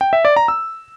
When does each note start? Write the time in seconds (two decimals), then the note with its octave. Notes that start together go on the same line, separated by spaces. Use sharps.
0.01 G5
0.13 E5
0.25 D5
0.36 A#5
0.48 E6